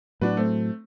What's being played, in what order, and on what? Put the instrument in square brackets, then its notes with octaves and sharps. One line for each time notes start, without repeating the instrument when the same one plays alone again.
[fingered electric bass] A2 F#3 [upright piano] D4 F#4 B4
[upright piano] A3 C4